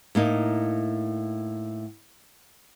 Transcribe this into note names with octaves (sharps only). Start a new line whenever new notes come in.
A2 A#3 D#4